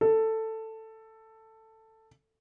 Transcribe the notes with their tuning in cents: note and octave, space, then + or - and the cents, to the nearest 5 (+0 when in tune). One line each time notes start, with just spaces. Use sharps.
A4 +10